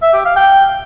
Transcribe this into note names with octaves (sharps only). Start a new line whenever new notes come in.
E5
G4
F5
G5